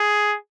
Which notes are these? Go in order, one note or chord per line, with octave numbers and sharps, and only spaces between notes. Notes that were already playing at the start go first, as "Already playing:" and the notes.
Already playing: G#4